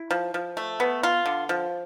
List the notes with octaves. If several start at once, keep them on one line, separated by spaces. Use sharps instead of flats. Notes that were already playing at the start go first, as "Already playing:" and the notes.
Already playing: E4
F3
F3
A3
B3
F4
D3
F3